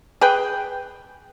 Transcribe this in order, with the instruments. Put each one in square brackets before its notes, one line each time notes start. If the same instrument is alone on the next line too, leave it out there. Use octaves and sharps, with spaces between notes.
[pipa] G#4 B4 G5